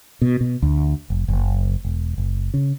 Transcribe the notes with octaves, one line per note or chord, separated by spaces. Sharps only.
B2
B2
D2
F1
F#1
E1
F#1
C#3